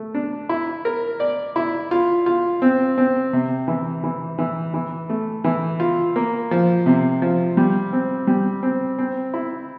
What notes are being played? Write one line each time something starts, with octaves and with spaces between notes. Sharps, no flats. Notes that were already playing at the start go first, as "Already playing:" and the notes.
Already playing: A3
D4
E4
A#4
D5
E4
F4
F4
C4
C4
C3
E3
E3
E3
E3
A3
E3
F4
A#3
F3
C3
F3
G3
C4
G3
C4
C4
E4